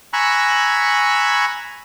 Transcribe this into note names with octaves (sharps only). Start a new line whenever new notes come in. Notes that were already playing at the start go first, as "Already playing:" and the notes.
G#5 A#5 B5 C#6 E6 F#6